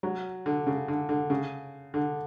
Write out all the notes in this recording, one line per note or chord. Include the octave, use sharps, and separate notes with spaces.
F#3
D3
C#3
D3
D3
C#3
D3